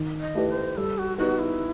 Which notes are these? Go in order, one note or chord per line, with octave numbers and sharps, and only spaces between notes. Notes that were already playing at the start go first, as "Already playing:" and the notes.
Already playing: D#3
D#5
A3 E4 G4 B4
C5
G3 A4
F#4
B3 D#4 F#4 G4 B4
E4